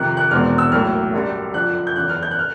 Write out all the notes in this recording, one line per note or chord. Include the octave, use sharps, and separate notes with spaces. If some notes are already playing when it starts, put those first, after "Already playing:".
Already playing: F2 C3 D#3 F#6
F#6
E1 E2 B2 G#3 C4 F6
E6
B1 A2 F#3 A#3 F6
F#2 D3 G3
F#1 F2 D3 F3 F#6
G6
F#1 E2 C#3 F#6
F6
G6
F#6
F6